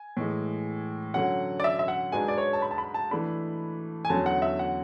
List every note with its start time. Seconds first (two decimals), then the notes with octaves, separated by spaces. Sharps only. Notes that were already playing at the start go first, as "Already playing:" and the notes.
Already playing: G#5
0.17 A2 E3 G#3
1.14 D3 F#3 C#4 F#5
1.60 D5
1.64 E5
1.79 E5
1.88 F#5
2.12 G#2 G#3 D4 F#4 B4 G#5
2.28 D5
2.38 C#5
2.53 A5
2.62 B5
2.71 A5
2.78 B5
2.94 A5
3.11 E3 A3 D4 B5
4.05 G#5
4.10 E2 D3 F#3 C#4 A5
4.26 F#5
4.42 E5
4.59 F#5